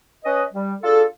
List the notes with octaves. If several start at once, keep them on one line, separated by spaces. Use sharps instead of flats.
C#4 B4 D#5
G3
D4 F4 G#4 A4